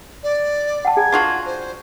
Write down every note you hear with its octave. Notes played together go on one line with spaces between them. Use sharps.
D5
F#5 G5 A5
G#4 G#5 A#5 G#6
D4 F4 F#4
C5